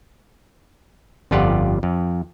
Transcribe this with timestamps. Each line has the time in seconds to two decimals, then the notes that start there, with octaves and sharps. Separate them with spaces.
1.31 G1 F2 F4 G4 D5 F#5
1.83 F2